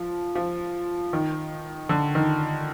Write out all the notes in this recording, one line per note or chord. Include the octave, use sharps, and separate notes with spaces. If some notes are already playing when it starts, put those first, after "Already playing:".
Already playing: F3
F3
D#3
D3
D#3